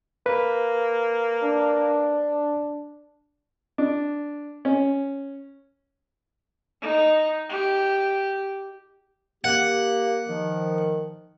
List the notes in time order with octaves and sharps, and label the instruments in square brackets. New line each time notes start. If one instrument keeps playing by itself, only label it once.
[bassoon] A#3 [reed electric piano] B4
[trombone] D4
[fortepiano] D4
C#4
[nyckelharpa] D#4
G4
[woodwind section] A#3 G4 [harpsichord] F#5
[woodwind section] D#3 F3